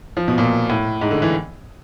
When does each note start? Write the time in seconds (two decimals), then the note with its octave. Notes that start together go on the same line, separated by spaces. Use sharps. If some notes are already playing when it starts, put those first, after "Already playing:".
0.17 F3
0.28 B2
0.38 A#2
0.70 A2
1.01 G#2
1.11 D3
1.22 E3